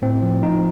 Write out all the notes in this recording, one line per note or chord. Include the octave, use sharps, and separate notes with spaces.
A2 C4
F3
F3 D#4